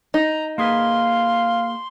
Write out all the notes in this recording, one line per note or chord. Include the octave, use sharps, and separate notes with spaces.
D#4 A#5
A#3 G#4 B4 F5 C6